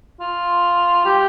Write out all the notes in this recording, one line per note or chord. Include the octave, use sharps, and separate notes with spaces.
F4
G4